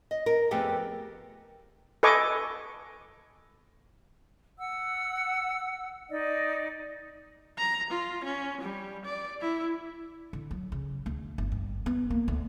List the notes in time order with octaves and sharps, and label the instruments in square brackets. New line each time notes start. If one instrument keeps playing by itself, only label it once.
[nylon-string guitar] D#5
A#4
F2 A3 B3 G4 G#4
[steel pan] A4 B4 D#5 G#5 C#6 D6
[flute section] F#5 E6
D#4 D5 D#5
[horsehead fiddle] A#5
F4
C#4
G3
D5
E4
[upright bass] D3
F#3
C#3
D2
G1
G2
B3
A#3
D2